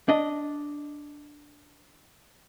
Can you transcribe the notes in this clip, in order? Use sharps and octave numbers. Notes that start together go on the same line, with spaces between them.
D4 D#5